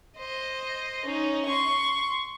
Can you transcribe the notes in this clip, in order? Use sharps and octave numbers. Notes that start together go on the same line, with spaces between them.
C5 D#5
C#4 D#4
C6 C#6